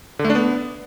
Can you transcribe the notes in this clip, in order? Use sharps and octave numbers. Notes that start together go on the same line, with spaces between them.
D3
A3
D4
B3